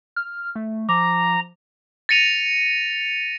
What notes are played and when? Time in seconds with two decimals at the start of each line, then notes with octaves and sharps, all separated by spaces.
0.16 F6
0.56 A3
0.89 F3 A#5 D6
2.09 A6 A#6 C#7 D#7 F7